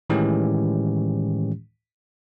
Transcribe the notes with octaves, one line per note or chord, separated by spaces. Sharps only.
A2 D#3 E3 G#3 C#4 G4